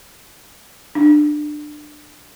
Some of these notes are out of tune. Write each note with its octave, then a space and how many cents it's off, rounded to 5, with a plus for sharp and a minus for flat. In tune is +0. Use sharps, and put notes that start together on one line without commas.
D4 +25